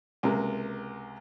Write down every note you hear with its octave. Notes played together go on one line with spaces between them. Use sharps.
C#2 C3 A#3